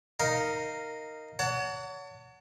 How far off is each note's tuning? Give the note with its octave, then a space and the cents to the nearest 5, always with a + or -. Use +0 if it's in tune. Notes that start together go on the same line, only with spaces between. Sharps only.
D#4 +0 A#4 -10 F5 -5
C#5 +35 F#5 +0 A5 +40